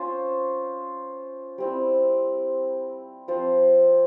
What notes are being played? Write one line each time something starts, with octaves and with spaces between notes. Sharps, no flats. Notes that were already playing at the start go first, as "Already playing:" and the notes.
Already playing: C#4 F4 C5
G3 C4 E4
F3 C4 F4 C5